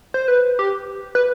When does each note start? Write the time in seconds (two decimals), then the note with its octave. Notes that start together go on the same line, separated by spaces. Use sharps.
0.14 C5
0.28 B4
0.59 G4
1.15 B4